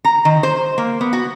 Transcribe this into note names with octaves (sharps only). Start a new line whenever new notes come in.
A#5
D#3
C5
A#3
B3
F#4